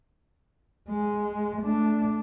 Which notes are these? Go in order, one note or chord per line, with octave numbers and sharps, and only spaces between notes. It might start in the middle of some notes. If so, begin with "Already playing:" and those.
G#3
A3 D4